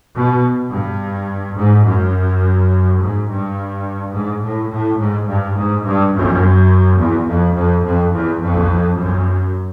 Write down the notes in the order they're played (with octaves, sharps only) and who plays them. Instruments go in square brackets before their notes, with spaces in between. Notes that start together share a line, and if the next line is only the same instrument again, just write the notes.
[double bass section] B2
G2
G#2
F#2
G#2
G2
G#2
A2
A2
G#2
G2
G#2
G2
F#2
E2
F2
F2
F2
E2
F2
F#2